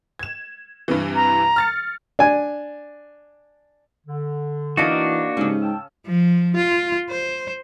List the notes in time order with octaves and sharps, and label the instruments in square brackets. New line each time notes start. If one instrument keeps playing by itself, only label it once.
[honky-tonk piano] G#6 E7
G2 C3 E3
[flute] A#5
[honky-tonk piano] F6 A6 C#7
[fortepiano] D4 G#5
[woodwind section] D3
[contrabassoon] E3 [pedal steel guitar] A#3 D4 F#4 [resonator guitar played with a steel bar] D#4 D#5 F5
[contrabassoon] G#2 [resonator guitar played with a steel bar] C#3 C#4 [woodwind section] G4
[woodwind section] G5 A5 E6
[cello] F3
F4
C5